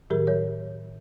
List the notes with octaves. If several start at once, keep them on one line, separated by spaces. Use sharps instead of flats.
A2 D#3 F#3 G4 G#4 A#4
F#3 C#5